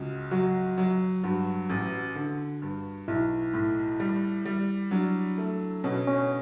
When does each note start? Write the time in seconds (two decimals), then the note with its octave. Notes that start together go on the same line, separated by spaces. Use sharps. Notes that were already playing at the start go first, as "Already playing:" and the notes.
Already playing: C#2 C#3 F#4
0.31 F#3 F#4
0.78 F#3
1.24 G2 F#4
1.69 A1
2.15 D3
2.62 G2
3.08 B1 E4
3.54 A2
4.00 G3
4.45 G3
4.91 F#3 D4
5.38 A3
5.84 B2 C#4
6.07 C#4